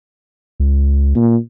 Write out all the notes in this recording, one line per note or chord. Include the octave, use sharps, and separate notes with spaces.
C#2
A#2